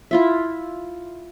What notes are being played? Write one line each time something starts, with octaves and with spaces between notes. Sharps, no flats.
E4 F4 E5